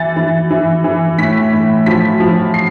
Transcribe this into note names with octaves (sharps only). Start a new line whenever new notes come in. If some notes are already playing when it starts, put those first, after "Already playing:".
Already playing: E3 A6
E3
E3
E3
A2 B6
A2
F3 B6
F3
C7